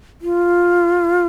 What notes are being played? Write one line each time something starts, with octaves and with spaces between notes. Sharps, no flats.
F4